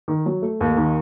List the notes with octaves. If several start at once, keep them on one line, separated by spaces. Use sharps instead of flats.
D#3
F#3
A3
D#2
D#3